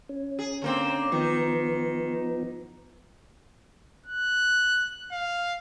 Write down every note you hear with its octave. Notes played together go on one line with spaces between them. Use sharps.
C#4
G#4
D3 A#3 C4
D#3 F3 B3
F#6
F5